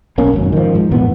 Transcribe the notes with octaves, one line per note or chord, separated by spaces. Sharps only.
B1 A#3 C#4
G#1 F#2
D#3 F3
G#2
F2 A#2 E3 B3